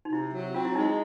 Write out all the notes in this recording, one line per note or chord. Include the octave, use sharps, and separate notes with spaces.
D#4
C3 E4
F#3
C4 F4
E4
G#3 D#4
E4